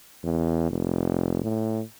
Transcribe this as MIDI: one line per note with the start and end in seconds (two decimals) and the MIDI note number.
0.24 0.66 40
0.70 1.40 29
1.44 1.81 45